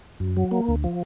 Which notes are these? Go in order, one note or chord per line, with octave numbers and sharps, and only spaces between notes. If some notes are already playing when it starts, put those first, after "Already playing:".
F#2
F#3
A#3
D2
F3